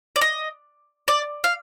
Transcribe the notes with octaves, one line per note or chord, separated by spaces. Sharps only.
D5
D#5
D5
F5